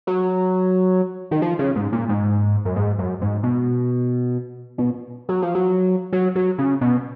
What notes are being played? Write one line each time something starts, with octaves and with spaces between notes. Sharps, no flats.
F#3
D#3
F3
C#3
G#2
A#2
G#2
F#2
G#2
F#2
G#2
B2
B2
F#3
F3
F#3
F#3
F#3
C#3
B2